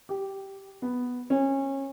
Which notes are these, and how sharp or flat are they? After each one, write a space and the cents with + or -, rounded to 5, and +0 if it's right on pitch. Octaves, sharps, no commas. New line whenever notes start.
G4 -10
B3 +0
C#4 -25